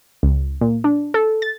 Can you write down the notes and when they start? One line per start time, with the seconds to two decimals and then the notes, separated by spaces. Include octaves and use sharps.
0.23 C#2
0.61 A#2
0.84 D4
1.14 A4
1.42 A6